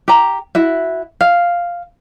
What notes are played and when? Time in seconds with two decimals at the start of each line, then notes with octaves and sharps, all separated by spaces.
0.08 G4 A#5
0.55 E4 F#4 E5
1.21 F5